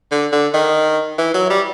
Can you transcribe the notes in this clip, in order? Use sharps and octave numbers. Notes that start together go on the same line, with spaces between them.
D3
D3
D#3
E3
F#3
G3